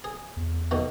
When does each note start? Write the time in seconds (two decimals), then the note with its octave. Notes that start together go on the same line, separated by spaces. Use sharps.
0.04 G#4
0.37 E2
0.71 B2 D#3 A3